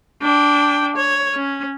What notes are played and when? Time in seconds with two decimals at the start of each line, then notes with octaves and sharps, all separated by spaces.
0.22 D4 G5
0.96 C#5
1.35 C#4